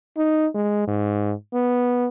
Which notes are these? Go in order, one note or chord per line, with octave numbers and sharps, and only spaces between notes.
D#4
G#3
G#2
B3